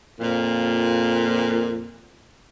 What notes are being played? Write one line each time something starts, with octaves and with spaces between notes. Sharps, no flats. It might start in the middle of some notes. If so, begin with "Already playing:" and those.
F2 A#2